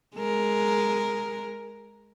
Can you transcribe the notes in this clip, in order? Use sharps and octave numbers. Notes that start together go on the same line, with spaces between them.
G#3 A#4